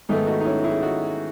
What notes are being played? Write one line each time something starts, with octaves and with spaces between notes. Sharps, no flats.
G#2 D#3 A3 B3 D#4
D#4 F#4
D#4
C#4 E4
E4 G#4
D#4 F#4